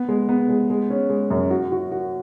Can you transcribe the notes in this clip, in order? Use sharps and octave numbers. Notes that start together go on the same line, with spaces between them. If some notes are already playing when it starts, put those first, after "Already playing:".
Already playing: B3
G#3
B3
G#3
G#3
C#4
G#3
F#2
F#4
F#4
F#4